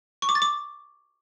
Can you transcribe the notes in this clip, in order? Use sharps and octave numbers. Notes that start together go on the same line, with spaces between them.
C#6
D6
A6
D6